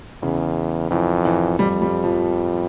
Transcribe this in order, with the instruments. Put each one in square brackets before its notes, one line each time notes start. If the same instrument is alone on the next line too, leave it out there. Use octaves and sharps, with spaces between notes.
[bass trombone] E2 [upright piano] C#3
[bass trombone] F2 [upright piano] E3
[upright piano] E3
[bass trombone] F2 [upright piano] G3
[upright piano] G3
F3